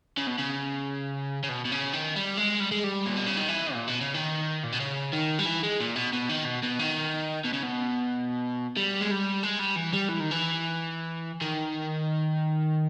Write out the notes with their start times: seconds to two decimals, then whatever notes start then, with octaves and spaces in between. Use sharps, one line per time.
0.17 C#3
0.27 B2
0.38 C#3
1.43 C#3
1.49 B2
1.65 B2
1.72 C#3
1.93 D#3
2.16 G3
2.37 G#3
2.60 G3
2.72 G#3
2.84 G3
3.06 A#2
3.16 B2
3.26 C#3
3.37 D#3
3.48 E3
3.73 A#2
3.88 B2
4.01 C#3
4.14 D#3
4.63 A#2
4.72 B2
4.80 C#3
5.13 D#3
5.39 G3
5.46 E3
5.63 G#3
5.80 A#2
5.96 B2
6.13 B2
6.29 D#3
6.45 B2
6.63 B2
6.79 D#3
7.44 B2
7.53 C#3
7.63 B2
8.77 G3
9.01 G#3
9.11 G3
9.43 G#3
9.60 G3
9.77 E3
9.93 G3
10.09 E3
10.20 D#3
10.31 E3
11.41 D#3